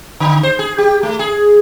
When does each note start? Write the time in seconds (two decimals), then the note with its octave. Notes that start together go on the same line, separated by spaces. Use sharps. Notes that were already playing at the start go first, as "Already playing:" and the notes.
0.20 D3
0.43 C5
0.59 G#4
0.78 G4
1.03 A3
1.19 G#4